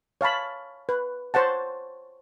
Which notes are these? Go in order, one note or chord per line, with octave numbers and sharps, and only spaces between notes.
C#5 F5 A5 B5
B4
C5 C#5 F#5 A5